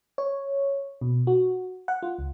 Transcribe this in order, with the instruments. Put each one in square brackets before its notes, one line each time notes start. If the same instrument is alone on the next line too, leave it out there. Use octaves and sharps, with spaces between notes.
[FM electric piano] C#5
B2
F#4
F#5
F4
C#2